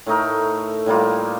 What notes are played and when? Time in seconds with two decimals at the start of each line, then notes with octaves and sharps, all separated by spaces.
0.06 A2 A3 D#4 A#4
0.86 A2 G3 A#3 F4